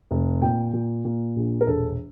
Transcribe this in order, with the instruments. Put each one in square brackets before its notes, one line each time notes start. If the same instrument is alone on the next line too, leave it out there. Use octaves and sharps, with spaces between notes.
[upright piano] F1
A#2 G5
A#2
A#2
A#1
A#4
E1 A4